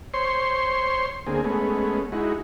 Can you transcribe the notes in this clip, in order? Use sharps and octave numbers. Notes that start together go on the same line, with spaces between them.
C5 C#5 C6
D2 A#3 C4 G#4
G#3 A3 B3 C#4
G#3 D#4 E4 F#4